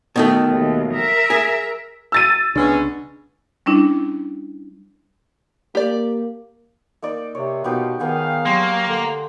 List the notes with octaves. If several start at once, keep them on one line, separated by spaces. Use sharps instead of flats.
B2 D#3 A3
D#2
A#4 E5
G#4
E6 A6 D#7
C2 C#3 G#3 B3 C#4 D4
G3 C#4 D4 E4
A#3 G4 D5
A#3 D#4 D5
C3 C#5
B2 B3 D#4 F4 G4
D#3 B3 G#4 F5 G5
F#3 A#3 G4 A#5 C6
D3